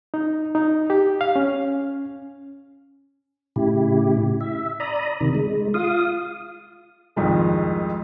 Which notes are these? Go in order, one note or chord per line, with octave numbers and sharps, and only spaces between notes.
D#4
D#4
G4
F5
C#4
A2 C#3 E4 G4
E5
D5 A#5 B5 D#6
C3 D#3
G#3
F4 F5 D#6
C2 F2 G#2 D#3 F3 G#3